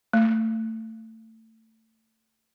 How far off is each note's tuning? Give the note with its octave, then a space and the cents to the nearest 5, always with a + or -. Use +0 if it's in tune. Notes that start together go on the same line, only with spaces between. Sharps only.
A3 +25